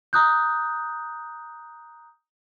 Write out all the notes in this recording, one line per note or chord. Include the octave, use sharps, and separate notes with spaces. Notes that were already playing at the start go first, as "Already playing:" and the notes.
A#5 D#6 F#6 G6